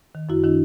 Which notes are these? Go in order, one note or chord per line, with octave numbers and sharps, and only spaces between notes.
D#3
F#2 E4 F#4
D#3 D4 E4